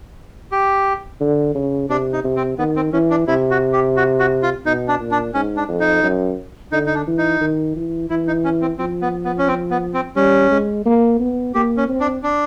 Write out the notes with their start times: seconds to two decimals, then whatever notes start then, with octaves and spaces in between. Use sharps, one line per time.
0.52 G4
1.20 D3
1.55 C#3
1.89 C3 D4
2.13 D#4
2.24 C3
2.36 C4
2.58 D#3 B3
2.76 C4
2.93 E3 C#4
3.11 D4
3.27 C3 E4
3.51 F#4
3.73 G4
3.97 F#4
4.19 F#4
4.43 F4
4.66 B2 D#4
4.88 D4
5.00 A#2
5.11 D4
5.34 G#2 C#4
5.57 D4
5.69 F2
5.80 D#4
6.03 F#2
6.72 D3 D#4
6.86 D#4
6.95 D4
7.07 E3
7.18 D#4
7.41 D#3
7.76 E3
8.10 E3 E4
8.27 D#4
8.44 C#4
8.61 C4
8.78 F3 C4
9.02 B3
9.25 B3
9.38 C#4
9.48 C4
9.71 B3
9.94 C4
10.16 G3 C#4
10.51 G#3
10.85 A#3
11.19 B3
11.55 A#3 G4
11.77 C#4
11.88 C4
12.00 D4
12.23 D4